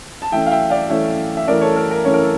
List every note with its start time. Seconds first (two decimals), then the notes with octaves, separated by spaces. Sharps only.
0.22 A5
0.32 E3 A3 C#4 E5 G5
0.46 F5
0.51 E5 G5
0.70 D5 F5
0.89 E3 A3 C#4 C#5 E5
1.37 E5
1.47 E3 A3 C#4 A#4 D5
1.61 A4 C#5
1.76 A#4
1.91 A#4
2.05 E3 A3 C#4 C#5
2.14 A#4
2.22 A4